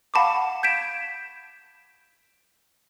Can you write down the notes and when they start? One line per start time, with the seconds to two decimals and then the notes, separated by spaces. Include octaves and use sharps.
0.14 F5 F#5 A5 B5 C#6 D6
0.63 G6 G#6 B6 D7 E7